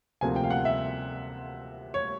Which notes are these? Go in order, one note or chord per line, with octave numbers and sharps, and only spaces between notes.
D2 C3 F3 A#3 G#5
G5
F5
F#5
E5
C#5